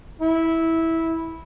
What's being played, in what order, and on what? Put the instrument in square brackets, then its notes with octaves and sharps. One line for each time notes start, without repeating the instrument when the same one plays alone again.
[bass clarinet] E4